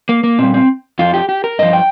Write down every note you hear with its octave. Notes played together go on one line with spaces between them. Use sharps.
A#3
A#3
A#2 G3 C4
C4
F2 F3 F4
G4
G4
A#4
G2 F3 D#5
G5